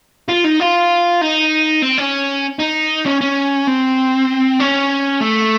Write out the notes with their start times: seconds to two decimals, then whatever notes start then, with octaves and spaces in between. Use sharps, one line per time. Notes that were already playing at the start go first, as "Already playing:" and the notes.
0.28 F4
0.44 D#4
0.60 F4
1.21 D#4
1.82 C4
1.98 C#4
2.59 D#4
3.06 C#4
3.21 C#4
3.68 C4
4.60 C#4
5.21 A3